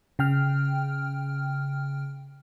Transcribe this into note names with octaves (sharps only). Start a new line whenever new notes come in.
C#3 G5 F6